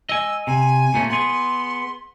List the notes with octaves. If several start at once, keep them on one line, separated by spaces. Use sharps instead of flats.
D#5 G#5 E6
C3 G#5
A#2 A3 C#4
B3 G#4 C6